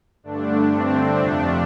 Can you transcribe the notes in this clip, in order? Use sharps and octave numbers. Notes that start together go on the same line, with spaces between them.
G2 D3 A3 D4
C4
F2 C3 F3 A3 D4